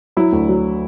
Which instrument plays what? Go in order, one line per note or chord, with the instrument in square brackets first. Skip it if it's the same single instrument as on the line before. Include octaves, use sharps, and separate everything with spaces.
[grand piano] F#3 E4
D2
F#3